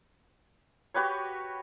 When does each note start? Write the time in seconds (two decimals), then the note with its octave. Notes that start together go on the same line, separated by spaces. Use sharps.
0.94 F#4 G4 B4 C#5